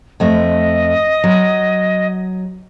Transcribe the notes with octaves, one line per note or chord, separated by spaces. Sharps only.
F2 A3 D#5
F#3